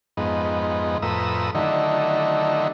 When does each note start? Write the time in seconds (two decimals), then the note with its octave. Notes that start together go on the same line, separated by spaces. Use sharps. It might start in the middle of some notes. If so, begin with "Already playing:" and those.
0.17 F2 G#2 B3 D#4
1.02 F2 A2 B4 A#5 D#6 E6
1.55 D3 D#3 F#3 A3 D#4 E4